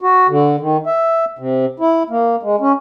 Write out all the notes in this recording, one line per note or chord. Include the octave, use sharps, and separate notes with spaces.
F#4
D3
D#3
E5
C3
E4
A#3
G#3
C#4